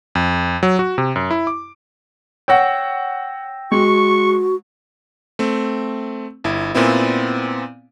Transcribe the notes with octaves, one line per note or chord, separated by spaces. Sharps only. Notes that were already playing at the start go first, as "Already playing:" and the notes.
F2
F#3
F#4
C3
F#2
E4
D6
C#5 F#5 G5 E6 A#6
G#3 F#4 C#6
A3 C4
G1 E4
A#2 B3 C4 E4